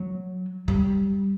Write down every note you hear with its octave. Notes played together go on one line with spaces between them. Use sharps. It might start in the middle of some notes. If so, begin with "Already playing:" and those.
Already playing: F#3
G3